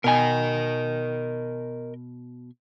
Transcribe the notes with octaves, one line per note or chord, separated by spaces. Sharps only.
B2 A#4 D#5 G#5